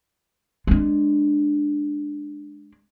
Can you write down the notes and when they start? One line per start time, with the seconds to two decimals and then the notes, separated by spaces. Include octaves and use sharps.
0.67 G#3 D4